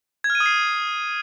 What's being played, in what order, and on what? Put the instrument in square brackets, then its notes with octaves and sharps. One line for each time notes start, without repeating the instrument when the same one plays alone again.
[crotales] G#6
F6
D#7
D#6
C7